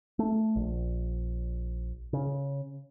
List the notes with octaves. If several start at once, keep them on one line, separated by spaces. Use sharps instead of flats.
A3
A#1
C#3